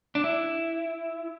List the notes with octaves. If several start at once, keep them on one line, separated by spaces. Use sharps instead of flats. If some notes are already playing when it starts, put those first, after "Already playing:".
D4
E4